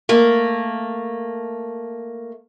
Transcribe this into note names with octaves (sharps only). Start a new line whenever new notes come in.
A3 A#3